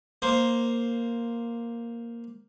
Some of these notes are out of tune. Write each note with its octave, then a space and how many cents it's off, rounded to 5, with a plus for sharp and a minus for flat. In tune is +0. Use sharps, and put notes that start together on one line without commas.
A#3 +0 C5 +0